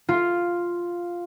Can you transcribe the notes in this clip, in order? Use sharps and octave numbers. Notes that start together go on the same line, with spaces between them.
F4